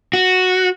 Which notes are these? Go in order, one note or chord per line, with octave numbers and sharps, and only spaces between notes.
F#4